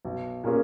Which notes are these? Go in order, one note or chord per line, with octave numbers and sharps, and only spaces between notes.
B1
A#2 A#3 C#4 G#4